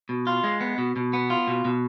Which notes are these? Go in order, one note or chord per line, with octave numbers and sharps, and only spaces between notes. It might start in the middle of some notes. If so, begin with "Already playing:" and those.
B2
F4
G#3
B3
B2
B2
B3
F4
B2
B2